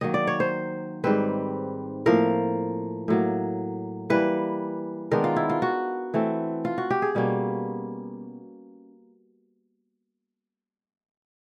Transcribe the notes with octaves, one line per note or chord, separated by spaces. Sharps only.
D#3 F#3 A#3 D#5
D5
C#5
C5
G#2 D#3 G3 C4 B4
A2 F3 A#3 A#4
A2 F#3 A#3
E3 G3 A#3 B4
D#3 G#3 B3 D4 A#4
F4
E4
F4
F#4
E3 A3 C4
F4
F#4
G4
G#4
B2 G3 A#3 C#4